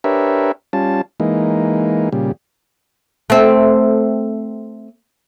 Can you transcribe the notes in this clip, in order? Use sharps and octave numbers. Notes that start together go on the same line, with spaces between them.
D4 G4 A#4 B4 C#5 E5
G3 C#4 F4 A5
E3 G#3 A#3 D#4
A#2 C#3 G3
A3 C4